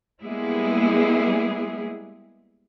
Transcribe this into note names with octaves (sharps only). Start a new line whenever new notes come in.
G3 G#3 A#3 B3 E4 G#4